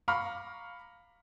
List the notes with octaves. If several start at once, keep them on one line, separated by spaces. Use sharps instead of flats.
F5 A#5 B5 C#6 D6 F6